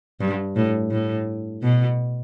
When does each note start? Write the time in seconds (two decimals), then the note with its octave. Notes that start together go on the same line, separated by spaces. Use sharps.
0.20 G2
0.56 A2
0.91 A2
1.63 B2